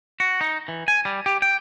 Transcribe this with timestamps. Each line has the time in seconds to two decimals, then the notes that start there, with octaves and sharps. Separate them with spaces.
0.20 F#4
0.41 D#4
0.68 E3
0.88 G#5
1.05 G3
1.26 G4
1.42 G5